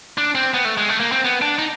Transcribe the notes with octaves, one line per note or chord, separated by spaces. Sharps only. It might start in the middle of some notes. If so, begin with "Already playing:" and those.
D4
C4
B3
A3
G#3
A3
A#3
C4
B3
D4
D#4